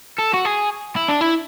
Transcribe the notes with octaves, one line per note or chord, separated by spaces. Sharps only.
A4
F#4
G#4
E4
D4
E4